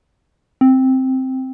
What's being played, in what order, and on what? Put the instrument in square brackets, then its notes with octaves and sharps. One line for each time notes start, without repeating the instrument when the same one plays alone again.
[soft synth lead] C4